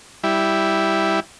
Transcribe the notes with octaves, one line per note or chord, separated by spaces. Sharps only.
G3 E4